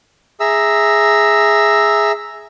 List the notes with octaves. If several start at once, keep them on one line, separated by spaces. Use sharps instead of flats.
G#4 E5 A#5 E6